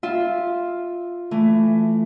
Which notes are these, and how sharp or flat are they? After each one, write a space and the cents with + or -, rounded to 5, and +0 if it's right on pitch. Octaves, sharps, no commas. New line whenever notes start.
F4 +0 E5 -10
E3 +20 A3 +0